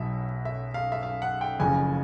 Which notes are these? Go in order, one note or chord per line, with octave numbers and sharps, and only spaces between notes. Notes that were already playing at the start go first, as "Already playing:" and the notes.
Already playing: B1 B2 F#3 E5
E5
F5
E5
F5
F#5
G5
F#1 F2 C#3 G#5